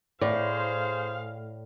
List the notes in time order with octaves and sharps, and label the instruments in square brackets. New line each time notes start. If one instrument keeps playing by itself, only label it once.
[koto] A2 [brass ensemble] G#4 C5 [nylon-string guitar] D5 [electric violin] F5